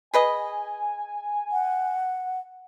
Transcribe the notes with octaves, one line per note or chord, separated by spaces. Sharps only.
G#4 B4 D#5 G#5
F#5